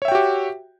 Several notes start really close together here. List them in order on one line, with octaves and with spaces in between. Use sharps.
C#5 E5 G5 F#4 G4